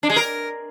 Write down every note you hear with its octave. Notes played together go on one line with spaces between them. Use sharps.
D4
G#3
A#4